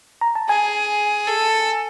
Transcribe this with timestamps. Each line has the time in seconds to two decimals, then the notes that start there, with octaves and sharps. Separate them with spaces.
0.21 A#5
0.35 A5
0.49 G#4 G#5
1.27 A4